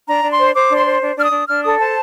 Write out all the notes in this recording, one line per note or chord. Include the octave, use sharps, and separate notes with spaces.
D4 A#5
D4
C6
C5
C5 D6
D4
C6
C5
D4
D4 F6
D#6
D4
D4 F6
A4 D#6
C5 A5